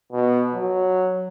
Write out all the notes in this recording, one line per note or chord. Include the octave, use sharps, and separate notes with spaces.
B2
F#3